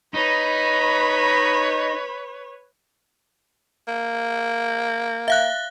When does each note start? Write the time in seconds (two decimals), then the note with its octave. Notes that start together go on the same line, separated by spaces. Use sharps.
0.14 D#4 B4 C#5 B5
3.88 A#3
5.28 E5 F5 F#6